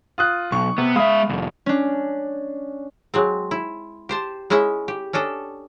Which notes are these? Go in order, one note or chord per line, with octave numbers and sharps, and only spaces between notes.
F4 D#6 F#6
B1 C#6
C3 B3
G#3 E5 F5 B5 D#6
C2 F2
C#4 D4
F#3 G#3 C4
E4
G4 C5 A5
G#3 C#4 E4 D#5 E5
G4
C#4 D4 A4 D#5